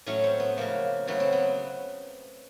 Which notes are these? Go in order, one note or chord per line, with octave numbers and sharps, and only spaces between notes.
A2 F#3 A3 C#4
C4
B3
C#3 F3 A3 A#3
C#3 F#3 A3 B3
C4
B3